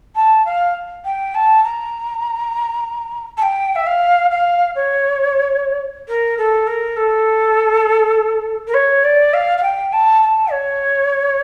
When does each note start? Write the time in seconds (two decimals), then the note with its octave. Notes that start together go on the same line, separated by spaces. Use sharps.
0.15 A5
0.45 F5
1.04 G5
1.34 A5
1.63 A#5
3.37 A5
3.42 G5
3.75 E5
3.86 F5
4.30 F5
4.75 C#5
6.08 A#4
6.37 A4
6.67 A#4
6.96 A4
8.67 A#4
8.73 C#5
9.03 D5
9.33 F5
9.57 F5
9.62 G5
9.92 A5
10.22 A5
10.51 C#5